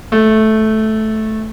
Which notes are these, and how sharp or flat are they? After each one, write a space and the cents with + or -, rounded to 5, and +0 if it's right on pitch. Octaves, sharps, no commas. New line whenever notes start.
A3 -10